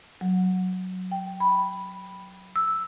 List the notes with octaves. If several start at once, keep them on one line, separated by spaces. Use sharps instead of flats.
F#3
G5
B5
E6